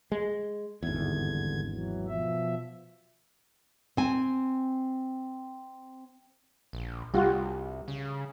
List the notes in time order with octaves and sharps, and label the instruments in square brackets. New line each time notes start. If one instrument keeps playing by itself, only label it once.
[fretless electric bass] G#3
[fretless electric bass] G#1 E2 [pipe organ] G2 D3 G#6
[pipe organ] E3 F#3
B2 F3 E5
[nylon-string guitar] C4 G#5
[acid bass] A#1
[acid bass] C2 [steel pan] G3 F4 F#4
[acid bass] C#3